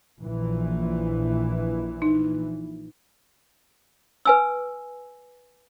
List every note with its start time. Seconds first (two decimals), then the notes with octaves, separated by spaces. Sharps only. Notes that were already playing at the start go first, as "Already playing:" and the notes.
0.19 A#1 E3
2.02 D#4
4.25 B4 G#5 E6